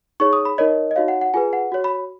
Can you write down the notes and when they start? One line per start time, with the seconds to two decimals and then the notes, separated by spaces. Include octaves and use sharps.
0.20 D#4 G#4 C#5 C#6
0.33 D#6
0.45 B5
0.58 D#4 A#4 C#5 D#5
0.91 D#5
0.96 D#4 F#4 C#5 F5
1.08 F#5
1.21 F#5
1.34 F4 G#4 B4 G#5
1.53 F#5
1.72 F#4 C#5
1.84 B5